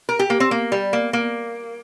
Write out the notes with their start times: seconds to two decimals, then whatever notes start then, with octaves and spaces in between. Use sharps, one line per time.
0.09 A#4
0.19 G4
0.30 A#3
0.40 C4
0.51 A#3
0.72 G3
0.93 A#3
1.13 A#3